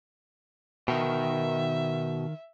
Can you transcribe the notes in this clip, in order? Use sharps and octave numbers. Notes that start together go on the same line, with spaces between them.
B2 D#3 A#4 E5 G5